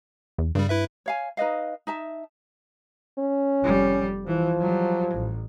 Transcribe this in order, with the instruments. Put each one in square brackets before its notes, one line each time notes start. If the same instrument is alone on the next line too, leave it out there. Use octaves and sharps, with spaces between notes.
[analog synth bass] E2
[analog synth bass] G2 [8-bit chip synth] C#3 G3
[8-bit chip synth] E4 B4 E5
[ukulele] C#5 F5 G#5
D#4 B4 D#5 F5
D#4 E5 A5
[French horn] C#4
[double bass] F1 G3
[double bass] E3 [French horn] F3
[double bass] F#3 G3
A1